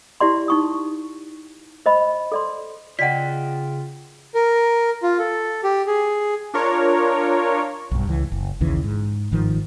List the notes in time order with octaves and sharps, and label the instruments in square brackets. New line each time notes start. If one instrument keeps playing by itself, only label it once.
[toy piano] E4 G4 D5 C6
D#4 C#6 D#6
C5 D#5 B5
A4 D5 C6
[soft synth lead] C#3 [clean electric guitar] F4 G5 [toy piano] D5 D#5 F#5 [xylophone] B6
[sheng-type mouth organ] A#4
F4
A4
G4
G#4
[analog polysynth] D4 F4 A#4 C#5
[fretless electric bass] B1 G2
C#2 E3
F#1
A#1 D#2 C#3 E3
G#2
G1 G#2 D#3 F3